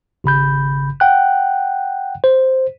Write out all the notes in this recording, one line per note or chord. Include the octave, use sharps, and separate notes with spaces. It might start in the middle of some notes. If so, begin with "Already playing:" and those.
G#1 C#3 B5 G6
F#5 G5 F#6
C5